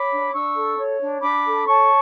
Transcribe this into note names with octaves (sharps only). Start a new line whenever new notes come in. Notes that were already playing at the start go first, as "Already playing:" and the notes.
Already playing: C#5 B5 D6
D4
D4 C#6 E6
A4
C#5
D4
D4 B5 D6
A4
C#5 A5 C#6